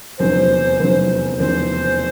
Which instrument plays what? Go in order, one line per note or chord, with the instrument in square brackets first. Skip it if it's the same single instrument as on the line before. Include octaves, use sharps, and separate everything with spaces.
[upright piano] F1 E2 C#3 F#3 [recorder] C5
[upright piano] F1 E2 C#3 F#3
[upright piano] F1 E2 C#3 F#3 [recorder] C5